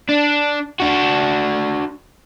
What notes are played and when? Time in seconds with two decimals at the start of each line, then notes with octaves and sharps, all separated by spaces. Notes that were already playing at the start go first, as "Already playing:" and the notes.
0.09 D4
0.80 D4 F#4